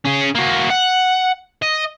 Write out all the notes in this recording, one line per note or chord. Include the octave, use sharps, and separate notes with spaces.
C#4 G#4
A#3 F#4
F#5
D#5